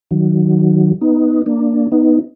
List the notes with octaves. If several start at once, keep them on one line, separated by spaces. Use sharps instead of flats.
D#3 F#3
B3 D#4
A#3 D4
B3 D#4